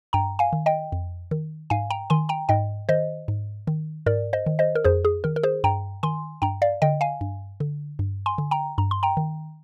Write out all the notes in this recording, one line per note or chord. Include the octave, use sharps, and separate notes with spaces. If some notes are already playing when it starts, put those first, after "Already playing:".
G2 G5 A#5
F5 G#5
D#3
D#5 G5
F2
D#3
G#2 F5 G#5
G5 A#5
D#3 G#5 C6
G5 A#5
G#2 D#5 G5
D#3 C5 D#5
G#2
D#3
G#2 A#4 D5
C5 D#5
D#3
C5 D#5
A#4
F2 G#4 C5
G#4
D#3 A#4
A#4
G#4 C5
G2 G5 A#5
D#3 G#5 C6
G2 G5 A#5
D5 F5
D3 D#5 G5
F5 G#5
G2
D3
G2
G#5 C6
D3
G5 A#5
G2 A#5
C6
G5 A#5
D#3